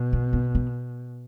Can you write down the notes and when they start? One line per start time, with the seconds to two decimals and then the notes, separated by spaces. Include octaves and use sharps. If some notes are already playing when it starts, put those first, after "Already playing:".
Already playing: B2
0.13 B3
0.33 B3
0.55 B3